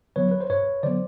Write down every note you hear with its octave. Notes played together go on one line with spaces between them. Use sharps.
D3 F#3 B3 B4 C#5
B4
C5
G2 B4 C#5
D3 F#3 B3 C5 D5